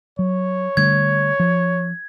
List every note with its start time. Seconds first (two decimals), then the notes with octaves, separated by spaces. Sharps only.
0.19 F#3 C#5
0.77 D3 G3 A3 G#6
1.40 F3